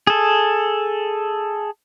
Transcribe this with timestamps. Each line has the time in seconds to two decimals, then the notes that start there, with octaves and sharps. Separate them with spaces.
0.07 G#4 A4